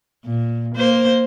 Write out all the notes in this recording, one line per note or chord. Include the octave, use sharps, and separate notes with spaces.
A#2
A#3 C5